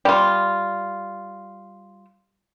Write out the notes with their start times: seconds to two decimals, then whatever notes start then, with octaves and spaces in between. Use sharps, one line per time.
0.05 G3 F4